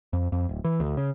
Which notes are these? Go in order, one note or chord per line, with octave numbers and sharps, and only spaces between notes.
F2
F2
D1
E3
D2
C#3